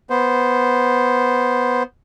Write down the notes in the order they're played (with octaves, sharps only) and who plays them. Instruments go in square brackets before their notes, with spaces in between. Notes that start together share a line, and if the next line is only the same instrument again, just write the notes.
[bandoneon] B3 C5